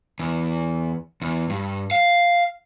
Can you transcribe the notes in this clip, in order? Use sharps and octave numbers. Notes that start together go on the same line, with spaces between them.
E2
E2
G2
F5